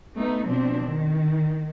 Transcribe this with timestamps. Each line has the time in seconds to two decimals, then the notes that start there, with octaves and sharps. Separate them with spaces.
0.16 A3 B3 D#4
0.47 B2 F3 C4 D4
0.88 D#3